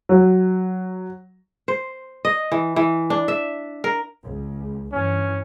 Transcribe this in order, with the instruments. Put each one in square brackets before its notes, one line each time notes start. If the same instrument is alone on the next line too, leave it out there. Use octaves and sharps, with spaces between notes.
[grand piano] F#3
[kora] C5
D#5
E3
E3
D4
E5
A#4
[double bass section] C#2
[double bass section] G2 E3 [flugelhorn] C#4